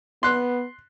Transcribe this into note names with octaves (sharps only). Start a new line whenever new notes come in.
B3 C6 F#6